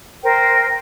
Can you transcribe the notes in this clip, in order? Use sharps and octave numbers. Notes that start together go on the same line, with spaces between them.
A#4 C5 G5